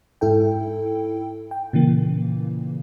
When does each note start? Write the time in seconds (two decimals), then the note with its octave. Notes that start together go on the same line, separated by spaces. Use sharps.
0.21 G#2 E4 A4 G5
1.51 G5
1.73 A#2 C#3 E3 A#3